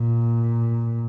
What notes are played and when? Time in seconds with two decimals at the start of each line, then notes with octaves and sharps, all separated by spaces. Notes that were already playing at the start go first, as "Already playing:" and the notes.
Already playing: A#2